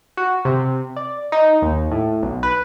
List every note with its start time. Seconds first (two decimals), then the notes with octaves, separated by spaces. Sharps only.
0.17 F#4
0.45 C3
0.97 D5
1.32 D#4
1.62 D#2
1.91 A2
2.23 B1
2.43 B4